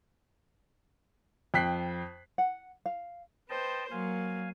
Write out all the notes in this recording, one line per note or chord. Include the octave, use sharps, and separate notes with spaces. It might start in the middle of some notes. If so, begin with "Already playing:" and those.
F2 G5 F#6 B6 C7
F#5
F5
B4 C5 D#5 G5 A5
F#3 A#3 F5 G#5